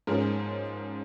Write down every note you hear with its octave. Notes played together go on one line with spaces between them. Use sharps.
G#2 F3 G#3 C#4 A#4